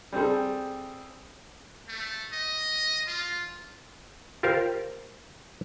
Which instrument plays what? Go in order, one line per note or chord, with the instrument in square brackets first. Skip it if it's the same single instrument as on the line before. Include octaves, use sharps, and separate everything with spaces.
[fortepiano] G3 C4 G#4 A4
[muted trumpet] A3
D#5
F4
[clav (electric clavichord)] F4 G4 A#4 C5 F5